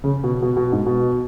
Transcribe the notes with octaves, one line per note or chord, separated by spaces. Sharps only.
C#3
B2
B2
B2
G#2
B2